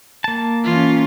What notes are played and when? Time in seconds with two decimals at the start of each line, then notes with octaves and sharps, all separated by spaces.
0.24 A#3 A5
0.64 E3 C#4 F4